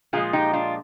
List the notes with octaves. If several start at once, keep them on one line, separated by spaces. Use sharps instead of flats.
A#2 F3 G#3 F4 G#4
D#4 G4
D4 F4